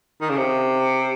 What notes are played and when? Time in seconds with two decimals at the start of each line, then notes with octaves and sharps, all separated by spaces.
0.21 D#3
0.30 C#3
0.37 C3